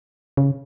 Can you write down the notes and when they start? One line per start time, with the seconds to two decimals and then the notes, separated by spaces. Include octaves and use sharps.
0.37 C#3